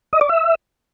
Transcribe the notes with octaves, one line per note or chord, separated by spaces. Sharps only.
D#5
D5
E5